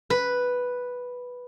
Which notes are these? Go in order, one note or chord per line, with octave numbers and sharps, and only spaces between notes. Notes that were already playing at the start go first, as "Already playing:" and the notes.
B4